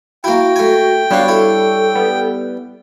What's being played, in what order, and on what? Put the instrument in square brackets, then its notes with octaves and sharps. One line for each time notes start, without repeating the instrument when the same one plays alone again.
[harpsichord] A#3 E4 [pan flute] F#4 [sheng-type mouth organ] G5
[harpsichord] A3 G#5
[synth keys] G3 D4 C#5 [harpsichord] B3 F#4 [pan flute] F5
[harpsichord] E4 [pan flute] A4
[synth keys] G3 B3